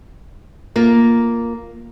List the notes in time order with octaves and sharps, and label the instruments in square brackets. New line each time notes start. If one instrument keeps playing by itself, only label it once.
[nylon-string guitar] A#3 F4